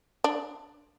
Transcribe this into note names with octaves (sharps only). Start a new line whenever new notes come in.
D4